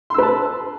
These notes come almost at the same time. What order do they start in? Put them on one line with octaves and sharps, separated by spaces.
C6 E6 B4 A5